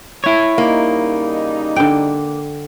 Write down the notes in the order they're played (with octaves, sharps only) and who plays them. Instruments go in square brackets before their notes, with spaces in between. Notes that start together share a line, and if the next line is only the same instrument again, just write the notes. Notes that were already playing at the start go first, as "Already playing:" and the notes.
[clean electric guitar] E4 C#5
[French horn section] C#3 G3 D#4 [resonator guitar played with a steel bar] A#3
[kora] D3 G5